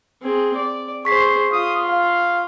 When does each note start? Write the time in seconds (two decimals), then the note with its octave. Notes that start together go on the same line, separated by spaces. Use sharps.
0.22 C4 G#4
0.56 D5
1.05 G#4 C5 C#6 B6 C7
1.53 F4 D#6
1.88 F5